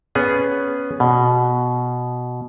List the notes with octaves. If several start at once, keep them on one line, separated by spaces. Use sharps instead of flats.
B3 C#4 G#4
B2